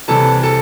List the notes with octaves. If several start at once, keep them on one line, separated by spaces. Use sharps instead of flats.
C2 C3 E3 A4 A5
A4 A5